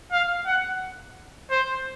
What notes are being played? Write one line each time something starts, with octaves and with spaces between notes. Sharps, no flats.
F5
F#5
C5